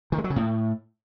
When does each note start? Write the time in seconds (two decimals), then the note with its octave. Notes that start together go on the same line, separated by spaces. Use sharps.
0.12 D#3
0.18 G#3
0.24 F#3
0.30 C#3
0.36 A2